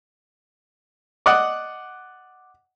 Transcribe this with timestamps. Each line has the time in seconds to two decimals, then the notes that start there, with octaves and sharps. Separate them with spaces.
1.26 D5 D#5 F#5